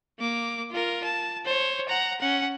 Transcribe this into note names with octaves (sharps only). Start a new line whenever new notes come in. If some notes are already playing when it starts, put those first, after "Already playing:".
A#3 D6
F4 A#4
A5
C5 C#5
F#5 A#5
C#4 F#5